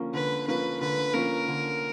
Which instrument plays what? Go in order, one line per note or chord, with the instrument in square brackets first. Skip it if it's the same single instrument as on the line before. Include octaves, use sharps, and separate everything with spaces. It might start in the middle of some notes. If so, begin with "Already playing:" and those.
Already playing: [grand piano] D3 F3 A#3 C#4
[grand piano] D3 [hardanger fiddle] B4
[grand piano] F3 A#3 C#4 [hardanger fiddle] B4
[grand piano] D3 [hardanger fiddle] B4
[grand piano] F3 A#3 C#4 [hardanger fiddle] A#4
[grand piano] D3